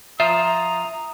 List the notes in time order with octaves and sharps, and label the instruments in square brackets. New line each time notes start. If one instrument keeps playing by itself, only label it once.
[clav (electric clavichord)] F3 F4 C5 [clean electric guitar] E5 [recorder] A#5 [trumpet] D#6